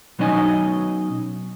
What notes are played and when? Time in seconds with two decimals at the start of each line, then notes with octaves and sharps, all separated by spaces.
0.19 B2 F#3 C#4 D#4 D#5 G#5